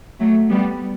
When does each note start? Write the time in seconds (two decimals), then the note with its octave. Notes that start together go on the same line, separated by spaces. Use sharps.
0.20 F#3 A3
0.50 G3 B3